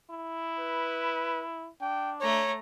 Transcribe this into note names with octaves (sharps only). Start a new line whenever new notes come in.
E4
B4
D4 G5
A3 C#5 A#5